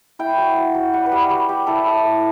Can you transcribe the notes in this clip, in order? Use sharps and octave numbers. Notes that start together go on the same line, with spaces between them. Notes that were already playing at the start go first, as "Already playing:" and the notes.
E4 G5
F#3
F#3
F#3
G3 F#5
B4
G3
G4
G3 F#4
G3 G4
E4 A4
E4 A4
A3